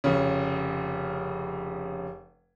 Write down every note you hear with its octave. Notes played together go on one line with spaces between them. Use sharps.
F1 C#3